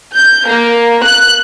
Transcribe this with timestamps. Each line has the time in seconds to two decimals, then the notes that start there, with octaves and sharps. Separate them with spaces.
0.15 G6
0.48 A#3
1.05 F#6